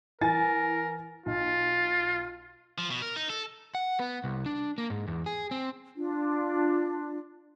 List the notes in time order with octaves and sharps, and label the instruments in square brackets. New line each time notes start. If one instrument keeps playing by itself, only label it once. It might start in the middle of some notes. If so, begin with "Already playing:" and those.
[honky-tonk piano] E3 G#5 A6 [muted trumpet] A#4
[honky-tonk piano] B1 [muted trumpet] F4
[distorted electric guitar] F3
B2
A#4
D#4
A4
[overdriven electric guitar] F#5
B3
C2
D4
A#3
G#2
E2
G#4
C4
[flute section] D4 F4